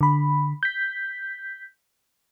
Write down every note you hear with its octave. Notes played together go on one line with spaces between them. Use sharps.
D3 B5
G6 B6